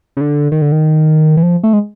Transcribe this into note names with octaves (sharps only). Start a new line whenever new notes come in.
C#3
D3
D#3
D3
D#3
E3
F3
A3
G#3